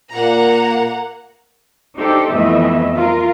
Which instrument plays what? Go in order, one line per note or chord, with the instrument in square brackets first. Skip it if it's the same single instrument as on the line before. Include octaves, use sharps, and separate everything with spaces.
[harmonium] A#2 [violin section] A#3 F#5 A#5
[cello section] D4 D#4 G4 A4 C5
F2 E3 A3 B3 D#5 E5
F4 A#4